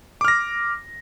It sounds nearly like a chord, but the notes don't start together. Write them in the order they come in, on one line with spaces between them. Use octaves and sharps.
D6 F6 A#6